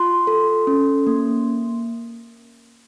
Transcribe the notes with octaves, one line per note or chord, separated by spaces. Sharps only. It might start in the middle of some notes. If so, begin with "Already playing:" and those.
Already playing: F4 C6
A4
C#4
A#3